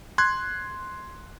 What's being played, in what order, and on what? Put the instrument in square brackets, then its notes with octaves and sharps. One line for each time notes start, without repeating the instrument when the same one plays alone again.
[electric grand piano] C6 F#6 G#6